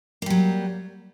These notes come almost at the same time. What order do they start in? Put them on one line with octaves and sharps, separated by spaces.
A#3 G3 F#3